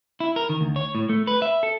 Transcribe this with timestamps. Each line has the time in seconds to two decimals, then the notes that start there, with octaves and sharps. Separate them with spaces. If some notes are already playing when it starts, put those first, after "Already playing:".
0.20 E4
0.36 A#4
0.49 D#3
0.61 D2
0.76 C#5
0.95 A2
1.09 A3
1.27 B4
1.42 E5
1.63 A4